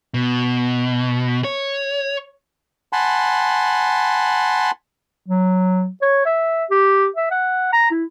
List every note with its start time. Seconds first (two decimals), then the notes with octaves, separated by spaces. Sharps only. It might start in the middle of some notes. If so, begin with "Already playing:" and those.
0.14 B2
1.44 C#5
2.93 F#5 G#5 A5 B5 C6
5.27 F#3
6.02 C#5
6.26 E5
6.71 G4
7.16 E5
7.31 F#5
7.73 A#5
7.91 E4